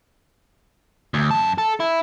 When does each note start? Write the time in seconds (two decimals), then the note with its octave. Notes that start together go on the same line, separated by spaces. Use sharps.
1.14 D2
1.31 F#2 A5
1.58 A4
1.80 E4